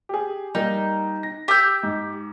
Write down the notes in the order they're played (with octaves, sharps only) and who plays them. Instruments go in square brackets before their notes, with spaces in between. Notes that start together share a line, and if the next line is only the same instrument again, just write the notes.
[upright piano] G4 G#4
[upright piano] G3 A#3 [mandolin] D#4
[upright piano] A#6
[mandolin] G4 E6 G6
[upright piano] G#2